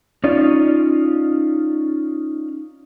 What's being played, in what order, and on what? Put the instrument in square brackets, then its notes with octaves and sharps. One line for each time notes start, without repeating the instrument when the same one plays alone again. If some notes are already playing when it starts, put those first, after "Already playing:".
[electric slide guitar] C#4 D#4 F4 D5